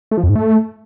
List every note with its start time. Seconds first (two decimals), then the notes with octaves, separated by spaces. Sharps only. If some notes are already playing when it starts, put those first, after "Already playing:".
0.11 A3
0.17 F3
0.23 F2
0.29 G#2
0.35 A3